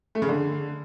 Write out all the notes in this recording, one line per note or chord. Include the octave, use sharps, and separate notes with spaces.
A3
C#3
D3